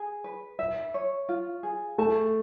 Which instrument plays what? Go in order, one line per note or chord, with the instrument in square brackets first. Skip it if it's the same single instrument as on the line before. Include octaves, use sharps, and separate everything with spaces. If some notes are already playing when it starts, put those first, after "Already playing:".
Already playing: [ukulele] G#4
B4
E5
C#5
F4
G#4
[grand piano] A3 [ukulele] A5